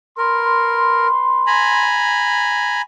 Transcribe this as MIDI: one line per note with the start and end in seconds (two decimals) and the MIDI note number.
0.18 1.07 70
0.18 1.98 71
0.18 1.98 84
1.47 2.82 80
1.47 2.82 82
1.47 2.82 83